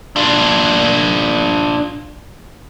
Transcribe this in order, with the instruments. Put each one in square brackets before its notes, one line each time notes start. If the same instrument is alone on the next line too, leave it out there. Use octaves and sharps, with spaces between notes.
[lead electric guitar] D4 F4